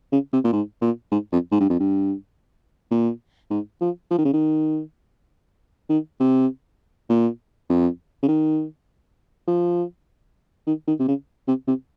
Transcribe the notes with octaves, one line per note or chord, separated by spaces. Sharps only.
C#3
C3
A#2
G#2
A#2
G#2
F2
G#2
G2
F2
G2
A#2
G#2
F3
F3
D#3
C#3
D#3
D#3
C3
A#2
F2
C#3
D#3
F3
D#3
D#3
C3
C#3
C3
C3